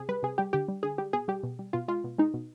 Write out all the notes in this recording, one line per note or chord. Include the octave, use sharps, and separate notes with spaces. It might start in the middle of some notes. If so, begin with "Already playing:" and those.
Already playing: C3 G#4
G3 B4
C3 G#4
G3 G4
D3 G4
G3
D3 G#4
G3 G4
B2 G#4
G3 G4
B2
G3
B2 F4
G#3 F4
B2
G#3 D#4
B2